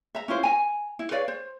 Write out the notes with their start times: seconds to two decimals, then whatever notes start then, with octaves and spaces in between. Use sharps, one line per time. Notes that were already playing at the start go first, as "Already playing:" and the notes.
0.15 E5 A#5
0.28 C#4 E4 F4 C5
0.43 G#5 A#5
0.99 E4
1.11 B4 C#5 D5 F5
1.28 C5